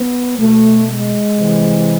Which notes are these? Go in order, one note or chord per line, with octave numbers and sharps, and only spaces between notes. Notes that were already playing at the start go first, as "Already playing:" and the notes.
Already playing: B3
B2 A3
G#3
C3 E3